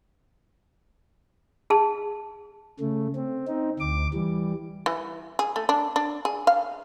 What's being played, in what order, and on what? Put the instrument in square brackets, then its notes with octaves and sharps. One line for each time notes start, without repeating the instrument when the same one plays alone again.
[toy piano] G#4 A5
[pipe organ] C#3 A3
C4
C4 D#4
D2 D6
E3 G3
[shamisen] E3
G#4
A3
D4
D4
G#4
F5